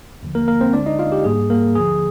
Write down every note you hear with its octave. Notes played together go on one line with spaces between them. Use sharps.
D#2 D3 F3
A#3 A#4
A#3 A#4
C4 C5
D2 D3 G#3 D4 D5
D#4 D#5
F4 F5
G4
G#2 G3 A#3 G#4
A#3 A#4
D#2 D3 F3 G#4